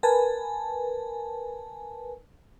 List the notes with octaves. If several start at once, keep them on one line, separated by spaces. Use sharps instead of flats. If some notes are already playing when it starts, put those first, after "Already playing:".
A#4 B4 G#5 A5